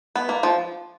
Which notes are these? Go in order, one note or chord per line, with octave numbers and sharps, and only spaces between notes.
B3
A#3
F3